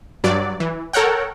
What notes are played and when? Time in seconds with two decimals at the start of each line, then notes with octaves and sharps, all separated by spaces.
0.24 G2 F#3 D5
0.60 E3
0.93 A4 A#4 C#5 F#5 G5